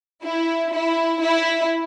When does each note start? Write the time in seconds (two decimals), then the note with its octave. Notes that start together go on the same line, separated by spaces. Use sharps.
0.24 E4
0.73 E4
1.21 E4